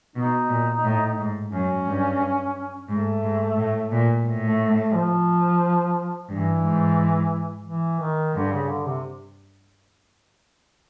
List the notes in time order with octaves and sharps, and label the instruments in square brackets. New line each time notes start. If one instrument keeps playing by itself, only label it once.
[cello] B2 [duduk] D#4
[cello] A#2
A2
G#2
[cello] F#2 [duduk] C#4
[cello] G2
[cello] G#2 [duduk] A3
[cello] G#2
A2
A#2
A2
[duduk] A3
A3
F3
[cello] G2 [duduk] E3
[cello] G#2
[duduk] E3
D#3
[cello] G2 [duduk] D3
[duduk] C#3
D3
C3